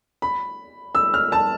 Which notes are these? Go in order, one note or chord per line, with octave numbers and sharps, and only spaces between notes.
B5
E6
F6
A5